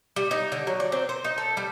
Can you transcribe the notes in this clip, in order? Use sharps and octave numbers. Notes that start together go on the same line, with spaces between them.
G3
D#4
D3
F#3
D5
C4
C5
D#4
A4
G3